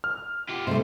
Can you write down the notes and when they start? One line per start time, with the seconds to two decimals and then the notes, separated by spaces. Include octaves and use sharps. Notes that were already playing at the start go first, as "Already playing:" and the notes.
0.04 F6
0.50 F4 G4
0.67 C3 A3 C5